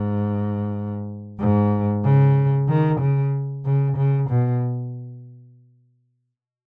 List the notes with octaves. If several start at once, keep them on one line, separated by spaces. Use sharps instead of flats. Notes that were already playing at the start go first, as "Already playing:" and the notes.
Already playing: G#2
G#2
C#3
D#3
C#3
C#3
C#3
B2